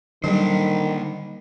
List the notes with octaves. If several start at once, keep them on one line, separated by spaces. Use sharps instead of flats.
D3 D#3 F#3 G3 A#3 C5